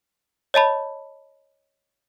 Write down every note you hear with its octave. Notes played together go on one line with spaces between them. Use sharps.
C#5 D#5 A5 B5